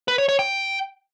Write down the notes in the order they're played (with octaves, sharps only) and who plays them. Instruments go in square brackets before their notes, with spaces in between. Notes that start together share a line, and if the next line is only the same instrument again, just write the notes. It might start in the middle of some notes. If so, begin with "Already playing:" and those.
[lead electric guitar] B4
C#5
C#5
G5